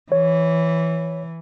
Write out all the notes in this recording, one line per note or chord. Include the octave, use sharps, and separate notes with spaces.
E3 C#5